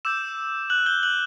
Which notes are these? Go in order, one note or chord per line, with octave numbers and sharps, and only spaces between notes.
D6 E6 G6 E7
F#6 F#7
G6 G7
F#6 F#7